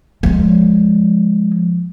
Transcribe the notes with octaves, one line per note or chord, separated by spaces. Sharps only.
F3 G#3